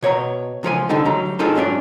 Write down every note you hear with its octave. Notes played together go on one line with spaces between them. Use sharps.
B2 C#5 D#5 A#5
C#2 F3 A4 G#5
C2 D3 G3 D#4 A4
D2 F#3 G3 A#5
D#4 F4 G#4 A4 C5
G#2 F#3 C#4 D4 D5